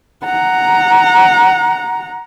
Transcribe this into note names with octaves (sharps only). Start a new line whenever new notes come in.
F#5 A#5